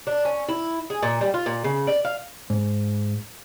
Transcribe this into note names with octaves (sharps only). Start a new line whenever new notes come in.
D4
C#4
E4
G#4
A#2
G3
F4
A#2
C#3
D5
F5
G#2